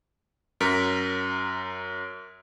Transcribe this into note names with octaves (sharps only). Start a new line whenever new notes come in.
F#2 A#4 B6